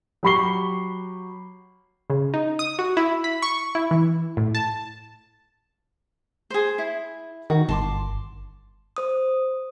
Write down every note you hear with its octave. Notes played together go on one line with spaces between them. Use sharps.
F#3 G4 B5 C#6 C7 G7
C#3
D#4
D#6
F#4
E4
B5
C#6
E4
E3
A2
A5
G#4 C5
E4
D#3 F#4
G1 A5 C6 D6
C5 D#6